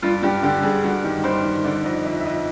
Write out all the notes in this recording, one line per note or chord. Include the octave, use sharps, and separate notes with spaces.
G2 F4
G2 G4
D3 G4
G2 G#4
G2 F#4
D#3 G4
G2 C5
D#3
D3 D5
F2 D#5
F2 E5
E5
F2 D#5